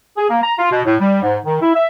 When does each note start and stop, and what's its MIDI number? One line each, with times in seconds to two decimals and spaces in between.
0.17 0.26 68
0.30 0.42 58
0.43 0.53 82
0.59 0.71 65
0.71 0.80 47
0.86 0.95 45
1.00 1.21 55
1.22 1.37 44
1.45 1.61 51
1.62 1.70 64
1.75 1.88 76